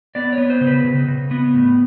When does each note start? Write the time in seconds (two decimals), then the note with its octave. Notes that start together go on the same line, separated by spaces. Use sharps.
0.15 B3 D5
0.33 C#5
0.38 B3
0.50 C5
0.61 C#3
0.67 B4
0.84 C#3
1.08 C#3
1.31 B3
1.54 A2